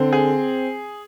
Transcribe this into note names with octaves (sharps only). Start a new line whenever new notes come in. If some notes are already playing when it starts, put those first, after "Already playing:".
Already playing: D3 C4
G#4